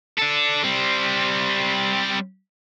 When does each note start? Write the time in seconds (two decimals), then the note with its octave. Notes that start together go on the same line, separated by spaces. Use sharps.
0.18 D4 A4
0.64 G3 C4